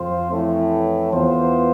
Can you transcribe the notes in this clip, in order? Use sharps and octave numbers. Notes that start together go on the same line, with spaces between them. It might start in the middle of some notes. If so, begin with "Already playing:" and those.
Already playing: F2 F3 C4 F4 C5
A2 E3 A3
E2 E3 B3 F4 C5